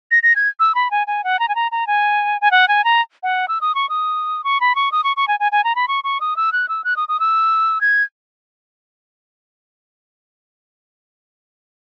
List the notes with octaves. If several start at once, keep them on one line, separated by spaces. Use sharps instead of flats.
A#6
A#6
G#6
E6
B5
G#5
G#5
F#5
A#5
G#5
A#5
A#5
G#5
G#5
F#5
G#5
A#5
F#5
E6
D#6
C#6
D#6
C#6
B5
C#6
D#6
C#6
C#6
G#5
G#5
G#5
A#5
B5
C#6
C#6
D#6
E6
F#6
E6
F#6
D#6
D#6
E6
G#6